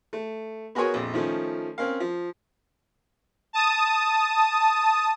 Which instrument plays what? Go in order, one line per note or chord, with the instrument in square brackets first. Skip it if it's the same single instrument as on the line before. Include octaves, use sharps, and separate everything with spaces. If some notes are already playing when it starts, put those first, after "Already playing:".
[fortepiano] A3
B3 F#4 G#4 A#4 C#5 G#5
A#1 F2
D#3 F3 A3 C#4
C4 C#4 A#4 F5
F3
[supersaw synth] A5 D#6